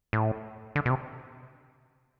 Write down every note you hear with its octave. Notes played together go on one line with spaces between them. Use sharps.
A2
D3
B2
C3